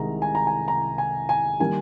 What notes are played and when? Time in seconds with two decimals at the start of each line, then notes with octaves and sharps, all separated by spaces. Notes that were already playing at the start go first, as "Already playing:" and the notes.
Already playing: C2 C3 D#3 G#3 A#5
0.22 G#5
0.35 A#5
0.47 G#5
0.68 A#5
0.98 G#5
1.29 G#5
1.60 D#3 G3 A#3 G#5